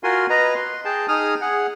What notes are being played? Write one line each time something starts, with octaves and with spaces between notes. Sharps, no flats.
F4 F#4 A#4 G#5 C6
B4 D#5 A#5
C6
G#4 G5 A5
D#4 G#4 D#6 F6
G#4 F#5